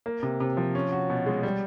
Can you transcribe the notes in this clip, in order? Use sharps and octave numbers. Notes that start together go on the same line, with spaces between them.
A#3
C3
C3
F3
C#4
F#4
B2
G#3
G3